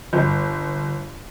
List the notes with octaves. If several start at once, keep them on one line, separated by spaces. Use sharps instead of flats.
G1